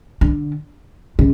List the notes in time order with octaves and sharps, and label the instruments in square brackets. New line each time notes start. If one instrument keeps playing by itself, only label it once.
[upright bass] D3
C#3